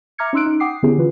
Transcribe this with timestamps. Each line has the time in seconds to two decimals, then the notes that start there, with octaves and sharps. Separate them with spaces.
0.18 E5 A#5 D6 F6 G#6 C#7
0.33 C#4 D#4 C6 E6 F#6 D7
0.46 D#4
0.60 F#5 G5 D6 D#6 C7
0.83 D3 B3 C#4 E4 G4 G#4
0.98 D3 E3 F4 B4